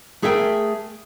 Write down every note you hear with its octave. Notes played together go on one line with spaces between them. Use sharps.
A3 G#4 A#4 E5 F5 G5